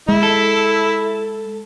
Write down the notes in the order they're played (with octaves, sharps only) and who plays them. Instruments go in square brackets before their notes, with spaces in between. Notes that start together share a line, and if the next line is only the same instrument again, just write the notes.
[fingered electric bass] G#3 [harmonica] E4
[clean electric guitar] A4